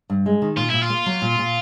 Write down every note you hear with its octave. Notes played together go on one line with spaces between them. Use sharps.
G2
G#3
D#3
A#2 F4
A#2 E4
F4
A#3
F#3
A#2
A#2